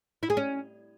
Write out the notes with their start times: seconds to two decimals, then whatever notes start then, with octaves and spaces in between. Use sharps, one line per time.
0.23 E4
0.30 G#4
0.37 C#4